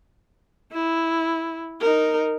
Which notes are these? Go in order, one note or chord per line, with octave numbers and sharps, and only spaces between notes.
E4
D#4 A#4